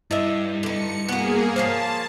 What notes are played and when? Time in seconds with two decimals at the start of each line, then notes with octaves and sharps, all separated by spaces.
0.11 G2 E4 D#5 E5
0.63 D3 D#4 C#7
1.09 A#3 B3 F#4 G#4
1.56 F3 A#3 C5 C#5 A5 C7